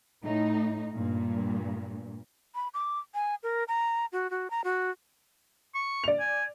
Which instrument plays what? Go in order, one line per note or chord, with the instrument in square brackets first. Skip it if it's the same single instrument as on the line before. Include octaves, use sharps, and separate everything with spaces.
[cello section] A2 D#4
G2 A#2
[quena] B5
D6
G#5
A#4
A#5
F#4
F#4
A#5
F#4
[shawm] C#6
[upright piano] D5 F7
[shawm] G#5